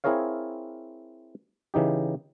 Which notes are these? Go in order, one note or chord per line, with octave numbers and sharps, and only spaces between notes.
C4 E4 G#4 A#4 C#5 F5
C#3 E3 D#4 G4